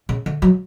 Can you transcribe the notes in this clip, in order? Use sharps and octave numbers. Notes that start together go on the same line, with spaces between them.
C#3
D3
F#3